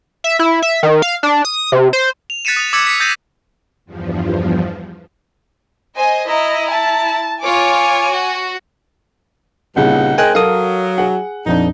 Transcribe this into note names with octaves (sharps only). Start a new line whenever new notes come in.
E5
E4
E5
D#3
F5
D4
D#6
C3
C5
F7
F#6 A6 B6 C#7 D#7 E7
D#6 F7
D6 E6 G#6 A6 B6 C#7
B6 C#7
D#6 G6 A6 A#6 C7 D#7
E2 G2 F3
C5 D#5 G#5
E4 D#5 A#5
A5
F4 C#5 G#5 D6
F#4
C2 G2 A#2 C#3 D#4 F#5
G#3 C4 A#4 D#5 G5 G#5 F#6
F#3 A4 A#4 F5 D#6
G#4 F#5
A#1 F2 D4 D#4